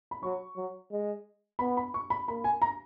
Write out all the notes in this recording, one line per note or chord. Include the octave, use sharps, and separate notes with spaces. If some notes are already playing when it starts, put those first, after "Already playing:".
B5
F#3 C#6
F#3
G#3
B3 B5
B5
C#6
B5
A#3 B5
G#5
A#5